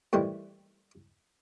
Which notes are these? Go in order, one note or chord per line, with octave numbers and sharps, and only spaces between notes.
A2 D#3 E3 G3 C5